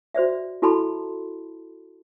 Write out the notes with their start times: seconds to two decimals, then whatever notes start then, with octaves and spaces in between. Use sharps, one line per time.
0.14 F#4 C5 D5 E5
0.62 E4 F#4 A4 A5 B5 C6